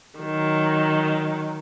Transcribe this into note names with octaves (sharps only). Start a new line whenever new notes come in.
D#3 F#3